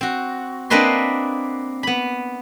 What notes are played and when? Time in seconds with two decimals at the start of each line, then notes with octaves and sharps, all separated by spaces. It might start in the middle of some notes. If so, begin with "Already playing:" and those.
0.01 C4 F#4
0.70 A#3 C4 D4 B4 D#5 C6
1.83 B3 B5